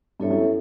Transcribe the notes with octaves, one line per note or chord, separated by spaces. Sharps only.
G2 B3 E4 A4 C#5 E5
F#2